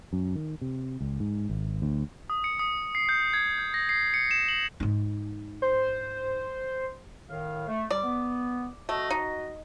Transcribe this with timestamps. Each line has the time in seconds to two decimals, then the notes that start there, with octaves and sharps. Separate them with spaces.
0.13 F#2
0.35 D#3
0.61 C3
1.01 C#2
1.20 G#2
1.49 G#1
1.82 D2
2.30 D#6
2.44 C#7
2.59 D#6
2.95 C7
3.09 G6
3.33 G#6
3.58 G6
3.74 A#6
3.89 C7
4.14 C#7
4.31 E7
4.48 F#7
4.80 G#2 D#4
5.62 C5
7.29 A2 D#3 F5
7.68 A3
7.91 G3 D5
8.03 B3
8.89 A3 F#4 D#5
9.10 D#4